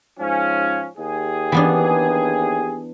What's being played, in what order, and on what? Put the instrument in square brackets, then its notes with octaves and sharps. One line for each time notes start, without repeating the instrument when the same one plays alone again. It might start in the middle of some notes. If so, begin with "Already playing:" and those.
[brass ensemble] G#2 F3 C#4
D#2 G4 G#4
[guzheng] E3 B3 D4